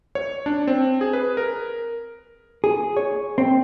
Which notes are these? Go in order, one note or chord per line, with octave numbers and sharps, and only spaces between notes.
C#5
D4
C4
G#4
B4
A#4
G#4
C#5
C4